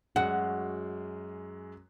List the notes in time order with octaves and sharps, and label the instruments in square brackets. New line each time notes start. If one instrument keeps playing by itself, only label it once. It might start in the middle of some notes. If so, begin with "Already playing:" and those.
[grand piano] F#2 G#3 F#6 [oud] F#4